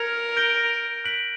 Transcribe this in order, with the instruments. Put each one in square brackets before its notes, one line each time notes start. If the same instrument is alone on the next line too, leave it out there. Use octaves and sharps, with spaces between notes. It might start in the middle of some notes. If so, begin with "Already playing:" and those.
Already playing: [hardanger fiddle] A#4 [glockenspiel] F6 G#6 C#7 F7
[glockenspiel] G6 A#6 D7 G7
F#6 B6 D7 F#7